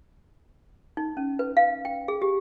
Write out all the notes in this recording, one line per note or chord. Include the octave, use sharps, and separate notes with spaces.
D#4
C#4
B4
F5
G5
G#4
G4